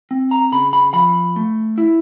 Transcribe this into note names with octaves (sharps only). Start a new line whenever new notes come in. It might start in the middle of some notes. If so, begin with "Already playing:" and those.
C4
A#5
C#3 B5
B5
F3 B5
A3
E4